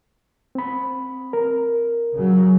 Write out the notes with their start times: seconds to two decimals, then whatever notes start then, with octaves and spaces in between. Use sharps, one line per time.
0.55 C4 B5
1.33 A#4
2.15 C#3 F#3